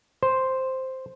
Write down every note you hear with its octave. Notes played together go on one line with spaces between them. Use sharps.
C5